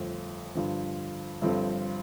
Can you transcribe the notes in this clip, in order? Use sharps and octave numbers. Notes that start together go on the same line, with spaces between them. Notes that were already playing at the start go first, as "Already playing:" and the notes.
Already playing: G1 F2 F3 A3
G2 D3 F3
G1 G2 F3 C4 A4